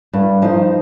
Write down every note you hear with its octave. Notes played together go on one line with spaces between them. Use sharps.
G2
F3 D#4 C5 D#5